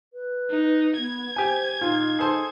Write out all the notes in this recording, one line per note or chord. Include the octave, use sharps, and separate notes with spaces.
B4
D#4
B3 G#6
G4 C5 G#5
A#2 D#4 F4
G#4 A4 C5